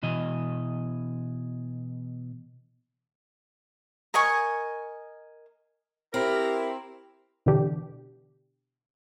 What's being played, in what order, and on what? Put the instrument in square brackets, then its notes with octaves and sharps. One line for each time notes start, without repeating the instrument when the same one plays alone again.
[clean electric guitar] B2 E3 D#5
[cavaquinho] A#4 D#5 G#5 C#6
[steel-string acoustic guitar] C4 [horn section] E4 A#4 [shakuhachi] G4
[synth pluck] B2 D3 E3 D4 G4